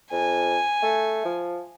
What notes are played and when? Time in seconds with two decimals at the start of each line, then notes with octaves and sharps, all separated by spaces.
0.12 F2 G#5
0.82 A3
1.25 F3